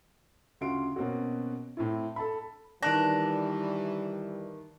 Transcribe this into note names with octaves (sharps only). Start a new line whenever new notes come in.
D2 C#3 F4 F#4 C6 D7
B2 A#3 C4 C#4 F#4
A2 C4 E4
A4 A5 B5
D#3 E3 G3 D4 F#6 A#6